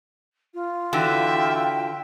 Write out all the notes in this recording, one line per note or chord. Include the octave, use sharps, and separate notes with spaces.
F4
D3 E3 F#4 E5 G5